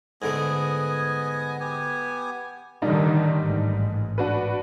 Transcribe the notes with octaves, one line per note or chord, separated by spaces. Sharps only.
G#2 D3 A3 B3 D#5 G#5
B3 G4 G#5
A2 D3 D#3 G3 D4 D#4
A1 G#2
D4 F#4 B4